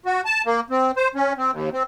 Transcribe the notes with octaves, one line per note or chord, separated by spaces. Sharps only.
F#4
A5
A#3
C4
C5
C#4
C4
D#2
C4